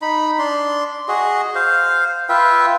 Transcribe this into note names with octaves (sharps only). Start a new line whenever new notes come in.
D#4 B5
D4 C6
F#4 G#4 D#5
C5 F5
F4 B4 E5 G5